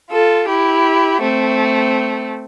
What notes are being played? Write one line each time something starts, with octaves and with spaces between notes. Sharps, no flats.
F4 A4
E4 G4
A3 C4